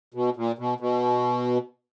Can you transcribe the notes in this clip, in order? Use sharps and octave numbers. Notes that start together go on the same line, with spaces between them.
B2
A#2
B2
B2